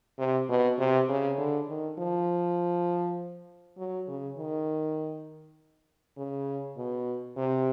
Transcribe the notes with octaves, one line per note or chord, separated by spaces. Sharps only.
C3
B2
C3
C#3
D3
D#3
F3
F#3
C#3
D#3
C#3
B2
C3